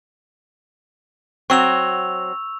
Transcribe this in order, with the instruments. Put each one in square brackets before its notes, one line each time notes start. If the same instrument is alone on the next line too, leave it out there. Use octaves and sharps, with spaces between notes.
[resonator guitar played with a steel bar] F#3 C4 [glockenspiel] C#6 E6 F7